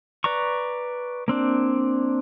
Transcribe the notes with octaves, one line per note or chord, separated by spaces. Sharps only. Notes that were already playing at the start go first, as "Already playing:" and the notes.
B4 D5 A#5 C#6
A#3 C4 D4